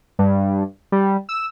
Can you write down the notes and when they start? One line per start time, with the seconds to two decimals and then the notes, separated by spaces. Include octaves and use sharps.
0.19 G2
0.92 G3
1.29 E6